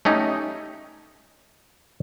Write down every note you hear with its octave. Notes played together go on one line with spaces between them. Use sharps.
A3 C#4 D#4 G4